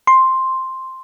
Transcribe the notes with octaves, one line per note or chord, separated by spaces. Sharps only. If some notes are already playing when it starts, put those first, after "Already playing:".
C6